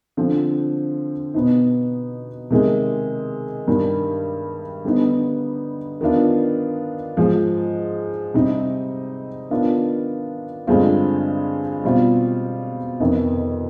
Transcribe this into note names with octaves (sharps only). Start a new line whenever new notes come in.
D3 F3 C4
B2 B3 D#4
C3 D#3 G#3
G2 D#3 G3
D3 G3 B3 D#4
D#3 B3 D4 F4
G#2 F3 G#3
C3 G3 C4 D#4
D#3 B3 D4 F4
G2 D3 G#3 C4 F4
B2 G3 C4 F4
F2 C3 D#3 B3 D#4